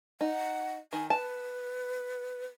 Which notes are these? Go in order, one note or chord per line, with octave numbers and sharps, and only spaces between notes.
D#4 F#5
D#3 G#5
B4 A5